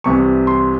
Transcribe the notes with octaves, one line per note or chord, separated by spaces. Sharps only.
C2 C3 E3 C#6
C6